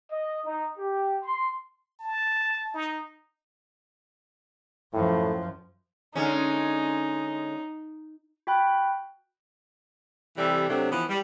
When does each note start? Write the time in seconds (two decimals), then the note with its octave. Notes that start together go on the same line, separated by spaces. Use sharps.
0.11 D#5
0.46 D#4
0.79 G4
1.24 C6
2.00 A5
2.74 D#4
4.94 F#2 A2 F3
6.15 D3 G#3 C#4 D#4
8.47 F#4 G5 B5 F#6
10.38 C3 E3 G3 A4
10.69 C3 F#3 A3 C4 D4
10.92 E3 F3 B3
11.09 G3